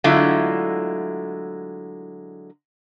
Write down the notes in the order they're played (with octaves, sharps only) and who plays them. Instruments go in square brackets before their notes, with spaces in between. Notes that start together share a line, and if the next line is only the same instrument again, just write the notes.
[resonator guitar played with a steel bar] D3 F#3 G#3 A3 E4 F4